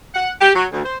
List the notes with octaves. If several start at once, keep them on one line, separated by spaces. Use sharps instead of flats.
F#5
G4
F#3
D2
C5